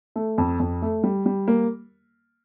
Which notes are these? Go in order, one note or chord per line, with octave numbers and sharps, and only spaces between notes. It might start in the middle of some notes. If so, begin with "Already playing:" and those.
A3
F2
F2
A3
G3
G3
A#3